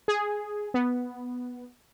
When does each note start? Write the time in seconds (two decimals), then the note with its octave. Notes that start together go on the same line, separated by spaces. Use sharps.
0.08 G#4
0.74 B3